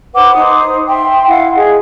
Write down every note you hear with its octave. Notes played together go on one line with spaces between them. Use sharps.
B4 C5 F#5 D6
D#4 C5 D#6
E5 G5 C6
E4 F5 F#5
G#4 D#5